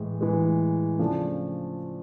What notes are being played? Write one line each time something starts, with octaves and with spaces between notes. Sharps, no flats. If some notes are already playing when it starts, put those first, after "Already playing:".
Already playing: A2 E3 G#3
A2 E3 G#3
C#3 F3 A3 D4